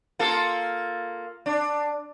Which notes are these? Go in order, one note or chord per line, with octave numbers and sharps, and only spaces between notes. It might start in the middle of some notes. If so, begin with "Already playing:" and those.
A#3 F4 A4
D4